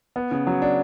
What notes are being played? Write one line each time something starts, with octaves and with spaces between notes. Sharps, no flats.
B3
C#3
F#3
D4